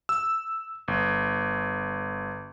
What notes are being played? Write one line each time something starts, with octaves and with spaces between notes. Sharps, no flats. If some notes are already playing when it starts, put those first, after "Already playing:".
E6
G1